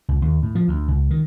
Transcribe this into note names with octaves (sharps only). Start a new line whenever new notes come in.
C#2
D#2
A2
F3
D2
C#2
D#3